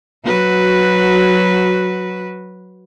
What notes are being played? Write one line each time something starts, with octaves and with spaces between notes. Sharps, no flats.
F#3 F#4 B4